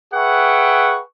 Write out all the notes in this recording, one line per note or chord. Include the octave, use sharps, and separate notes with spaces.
G#4 B4 E5 F#5 G5 C#6